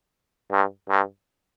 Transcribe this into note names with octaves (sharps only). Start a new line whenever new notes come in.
G2
G2